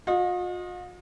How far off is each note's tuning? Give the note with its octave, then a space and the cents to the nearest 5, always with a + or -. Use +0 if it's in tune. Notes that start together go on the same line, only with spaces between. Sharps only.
F4 +45 D#5 -5